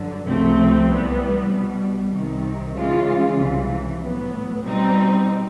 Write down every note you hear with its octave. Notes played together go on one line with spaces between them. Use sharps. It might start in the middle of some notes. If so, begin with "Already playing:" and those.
Already playing: G2 D3 F#3
C#2 C3 F3 A3 C4
C2 C3 E3 G3 B3
C2 B2 G3
C2 C3 D#3
C#3 E3 G#3 C#4 F4
C2 C3 E3
A2 F#3 B3
B2 G3 C4 D#4